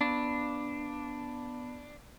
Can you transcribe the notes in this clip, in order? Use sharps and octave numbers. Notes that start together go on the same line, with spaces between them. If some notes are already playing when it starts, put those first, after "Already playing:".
B3 D4 B5